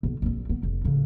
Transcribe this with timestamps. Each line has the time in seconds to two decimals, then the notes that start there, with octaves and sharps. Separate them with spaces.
0.03 B1
0.22 A#1 C4
0.49 B3
0.63 F1
0.84 A2 C#3